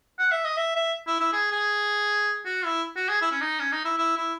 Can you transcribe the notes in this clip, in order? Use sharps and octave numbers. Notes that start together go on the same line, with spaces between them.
F#5
E5
D#5
E5
E5
E4
E4
G#4
G#4
F#4
E4
F#4
G#4
E4
C#4
D#4
C#4
D#4
E4
E4
E4